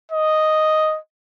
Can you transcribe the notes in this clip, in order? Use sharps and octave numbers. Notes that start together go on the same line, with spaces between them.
D#5